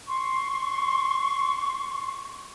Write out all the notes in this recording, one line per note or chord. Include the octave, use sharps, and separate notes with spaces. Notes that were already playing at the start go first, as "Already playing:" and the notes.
C6 C#6